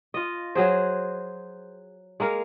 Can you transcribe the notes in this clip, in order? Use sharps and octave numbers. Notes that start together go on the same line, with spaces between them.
F4 D#5
F#3 G#4 C5
G#3 A#3 A#4 F5